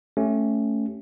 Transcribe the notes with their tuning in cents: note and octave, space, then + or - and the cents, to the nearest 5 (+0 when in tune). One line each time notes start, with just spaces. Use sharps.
A3 +0 C#4 +0 G4 -20